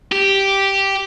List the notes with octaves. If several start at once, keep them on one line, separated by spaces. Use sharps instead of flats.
G4